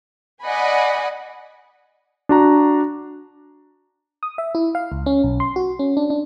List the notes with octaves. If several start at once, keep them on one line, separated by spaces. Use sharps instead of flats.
D5 D#5 F#5 G#5 B5
D4 F#4 A#5
D#6
E5
E4
F5
C#2
C#4
B1
C6
F#4
C#4
D4
D4